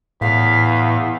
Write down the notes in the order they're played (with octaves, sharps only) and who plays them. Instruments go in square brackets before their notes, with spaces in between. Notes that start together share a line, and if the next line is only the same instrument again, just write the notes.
[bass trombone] E2 [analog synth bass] A2 [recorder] F5 [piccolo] B6